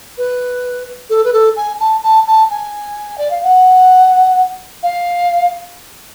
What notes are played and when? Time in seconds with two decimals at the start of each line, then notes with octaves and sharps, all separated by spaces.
0.17 B4
1.09 A4
1.24 B4
1.33 A4
1.56 G#5
1.80 A5
2.03 A5
2.27 A5
2.50 G#5
3.18 D5
3.30 F5
3.43 F#5
4.83 F5